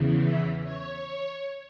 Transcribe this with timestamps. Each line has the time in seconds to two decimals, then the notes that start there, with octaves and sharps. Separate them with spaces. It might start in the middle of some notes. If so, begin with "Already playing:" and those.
Already playing: E2 C#3 E3
0.24 E5
0.63 C#5